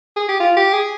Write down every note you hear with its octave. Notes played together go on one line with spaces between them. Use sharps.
G#4
G4
F4
G4
G#4